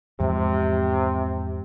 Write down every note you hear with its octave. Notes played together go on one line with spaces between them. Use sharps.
E2 G#2 C3 F3